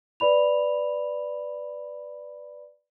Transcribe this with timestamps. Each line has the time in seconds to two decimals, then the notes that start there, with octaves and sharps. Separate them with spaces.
0.20 B4 D5 B5 F7